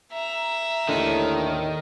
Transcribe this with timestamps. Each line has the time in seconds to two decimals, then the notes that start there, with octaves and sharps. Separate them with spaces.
0.13 E5 A#5
0.89 D#2 A2 D3 D#3